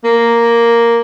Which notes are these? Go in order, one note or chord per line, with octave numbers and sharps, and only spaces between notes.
A#3